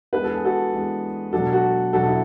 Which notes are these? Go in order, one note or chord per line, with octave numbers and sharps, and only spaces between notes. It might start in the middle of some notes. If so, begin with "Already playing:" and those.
E3 G#3 B3 D4 B4
A4
G#4
F#4 A4
E3 G#3 B3 D4
B2 F#3 B3 D4 F#4 A4
F#4 A4
B2 F#3 B3 D4 F#4 A4
E4